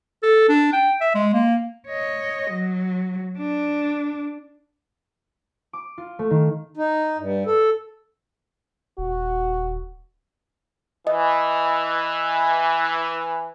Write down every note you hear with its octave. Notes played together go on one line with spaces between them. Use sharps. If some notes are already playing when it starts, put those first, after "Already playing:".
A4
D4
G5
E5
G#3
A#3
C#5 D#5
F#3
D4
D6
F4
A3
D#3
D#4
G2
A4
D#1 F#4
E3 D#5